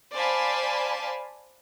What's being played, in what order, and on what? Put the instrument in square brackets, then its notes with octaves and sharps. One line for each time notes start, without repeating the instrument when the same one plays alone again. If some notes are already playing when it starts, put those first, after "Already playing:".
[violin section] C5 D5 F5 G#5 A5 B5